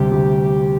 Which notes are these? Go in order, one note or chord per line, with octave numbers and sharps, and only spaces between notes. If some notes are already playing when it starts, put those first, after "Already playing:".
Already playing: D2 C3 G3 G4
D2